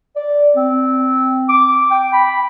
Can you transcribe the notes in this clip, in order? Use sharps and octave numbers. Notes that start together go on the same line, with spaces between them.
D5
C4
D6
G5
B5